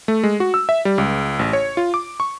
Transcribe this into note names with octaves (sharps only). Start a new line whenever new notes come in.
A3
G#3
F#4
E6
E5
G3
C#2
A1
C#5
F4
D6
C#6